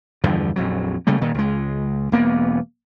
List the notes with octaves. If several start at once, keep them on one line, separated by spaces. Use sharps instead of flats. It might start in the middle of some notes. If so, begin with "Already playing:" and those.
E2 G2 D3 F3
A#1 F2 F#3
C#3 G3 A3 A#3
A#2 D#3
C#2 G#3
E1 A#3 B3